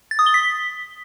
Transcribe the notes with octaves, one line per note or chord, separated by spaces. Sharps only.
A6
D#6
G7
B6